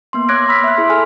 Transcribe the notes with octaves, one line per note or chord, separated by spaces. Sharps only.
A#3 B3 C6
C#5 D6 F#6 G#6 A#6 D7
B5 C6 E6 F6 B6
E5 F#6
E4 G#4 C6
G#4 A4 G#5 B5 E6 F6